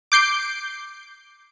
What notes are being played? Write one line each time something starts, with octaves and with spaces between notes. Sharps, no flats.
D6 G6 C7 D7